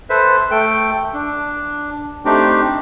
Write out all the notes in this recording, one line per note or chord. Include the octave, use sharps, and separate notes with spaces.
A4 B4 C5 E5
A3 A4 G5
D4
A3 C4 D4 D#4 G4